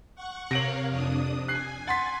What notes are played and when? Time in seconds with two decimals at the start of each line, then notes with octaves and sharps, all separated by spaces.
0.15 F#5 C#6
0.51 C3 A#4 C#5 F5 A#6 D7 F#7
0.89 F2 D4 D#6
1.48 G#5 F#6 C7
1.87 F#5 C6 A6 B6